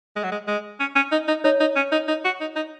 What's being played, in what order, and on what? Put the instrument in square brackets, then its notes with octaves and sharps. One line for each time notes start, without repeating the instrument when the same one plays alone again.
[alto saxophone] G#3
F#3
G#3
G#3
C#4
C#4
D#4
D#4
[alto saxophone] D#4 [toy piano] C#5
[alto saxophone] D#4
C#4
D#4
D#4
F#4
D#4
D#4